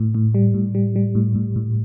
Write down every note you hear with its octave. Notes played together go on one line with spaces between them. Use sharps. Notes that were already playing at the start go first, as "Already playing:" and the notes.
Already playing: A2
A2
G3
A2
G3
G3
A2
A2
A2